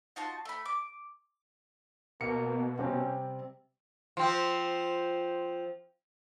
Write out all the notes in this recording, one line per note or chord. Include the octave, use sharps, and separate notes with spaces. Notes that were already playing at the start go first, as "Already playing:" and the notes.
D#4 F4 F#4 A5
A3 B5
D6
B2 A#3 C#7
C3 G3 C4 C#4
F3 C4